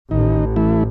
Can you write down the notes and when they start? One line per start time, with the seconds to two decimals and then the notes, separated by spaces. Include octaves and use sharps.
0.11 A1 D#3 D#4
0.56 E3 A3 E4